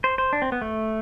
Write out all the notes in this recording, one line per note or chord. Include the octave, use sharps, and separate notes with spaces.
C5
C5
D4
C4
B3
A3